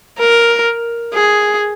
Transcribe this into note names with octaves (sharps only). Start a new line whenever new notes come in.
A#4
G#4